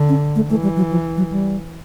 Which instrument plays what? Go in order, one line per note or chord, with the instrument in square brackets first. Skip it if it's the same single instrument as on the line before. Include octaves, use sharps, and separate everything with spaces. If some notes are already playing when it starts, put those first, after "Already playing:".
Already playing: [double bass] D3
[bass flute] C#4
A3
[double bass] E3 [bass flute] A3
[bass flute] G3
F#3
F3
F#3
G3